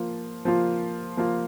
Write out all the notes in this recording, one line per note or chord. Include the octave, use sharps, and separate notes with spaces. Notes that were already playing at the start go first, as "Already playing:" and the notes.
Already playing: F3 A#3 F4
F3 A#3 F4
F3 A#3 F4